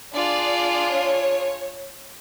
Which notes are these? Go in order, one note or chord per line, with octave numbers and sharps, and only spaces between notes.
D4 F4 G#4 D5
C#5